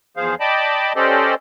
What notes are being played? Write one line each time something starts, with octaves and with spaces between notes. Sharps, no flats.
E2 F3 G#4 C5 F5
D5 D#5 G5 A5 B5 D6
C#4 G4 A4 C5 D5 D#5